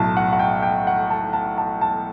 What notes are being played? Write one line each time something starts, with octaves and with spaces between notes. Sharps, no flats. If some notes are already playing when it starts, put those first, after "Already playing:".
Already playing: B1 A2 F#3 A5
F#5
F#5
G5
G5
F#5
A5
A5
A5
A5